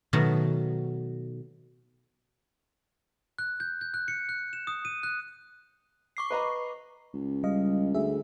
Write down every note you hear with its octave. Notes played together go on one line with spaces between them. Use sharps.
B2 D#3 F#3 A3
F#6
G6
G6
F#6
C#7
F#6
E7
D#6
D#7
F#6
C#6 D6 C7
B4 D#5 A#5
C#2
G3 D#5 F5
D2 G#4 E5